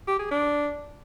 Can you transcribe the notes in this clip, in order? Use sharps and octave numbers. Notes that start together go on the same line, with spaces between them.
G4
G#4
D4